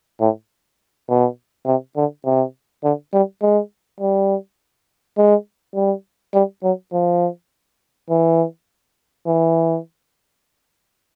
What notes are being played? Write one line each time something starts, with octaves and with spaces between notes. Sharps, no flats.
A2
B2
C3
D3
C3
D3
G3
G#3
G3
G#3
G3
G3
F#3
F3
E3
E3